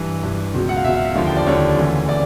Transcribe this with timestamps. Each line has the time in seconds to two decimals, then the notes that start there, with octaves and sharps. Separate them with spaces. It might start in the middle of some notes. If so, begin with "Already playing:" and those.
Already playing: G2 E3
0.23 G2 E3
0.54 C#2 B2 F#3
0.69 F#5
0.77 F5
0.84 C#2 B2 F#3 E5
0.95 F5
1.05 E5
1.15 D#2 D3 F3 F5
1.27 G5
1.37 D5
1.46 D#2 D3 F3 C#5
1.77 D2 C#3 E3
2.09 C#3 D5